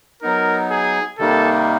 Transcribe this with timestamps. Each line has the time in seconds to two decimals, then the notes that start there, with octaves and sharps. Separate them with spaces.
0.22 F#3 B3 D#4 A#4
0.71 G#4
1.19 C3 D#3 G3 A#3 D#4 A4